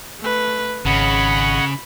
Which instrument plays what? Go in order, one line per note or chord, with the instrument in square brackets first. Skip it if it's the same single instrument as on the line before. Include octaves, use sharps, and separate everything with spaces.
[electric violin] A3 B4
[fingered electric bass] G#1 [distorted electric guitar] C#3 [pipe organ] C#5 D#5 F#5 [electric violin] B5